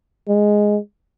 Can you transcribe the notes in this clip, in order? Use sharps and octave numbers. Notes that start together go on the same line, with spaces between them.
G#3